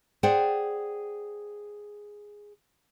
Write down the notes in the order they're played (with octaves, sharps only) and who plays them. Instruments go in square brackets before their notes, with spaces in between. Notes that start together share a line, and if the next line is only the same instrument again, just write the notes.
[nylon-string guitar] G#4 C5 D5 F#5 G5